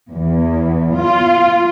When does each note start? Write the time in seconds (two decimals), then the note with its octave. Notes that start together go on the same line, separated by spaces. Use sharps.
0.13 E2
0.97 F4